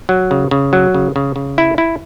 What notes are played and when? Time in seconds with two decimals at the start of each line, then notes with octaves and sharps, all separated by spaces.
0.09 F#3
0.31 C#3
0.51 C#3
0.73 F#3
0.94 C#3
1.16 C#3
1.36 C#3
1.58 E4
1.78 E4